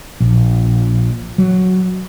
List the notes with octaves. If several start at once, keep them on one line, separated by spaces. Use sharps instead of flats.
A#1
F#3